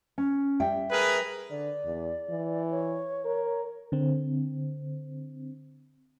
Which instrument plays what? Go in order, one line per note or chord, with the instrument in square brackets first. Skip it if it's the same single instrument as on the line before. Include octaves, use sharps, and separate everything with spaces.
[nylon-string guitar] C#4
G3 E5 G5
[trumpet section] G#4 A#4 B4
[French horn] D3 [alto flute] D5
[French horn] E2
E3
[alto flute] C#5
[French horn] A#4
[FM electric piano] D3 C4